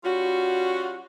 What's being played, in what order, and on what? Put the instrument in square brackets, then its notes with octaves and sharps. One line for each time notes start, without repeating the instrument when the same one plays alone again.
[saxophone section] G3 C#4 F4 F#4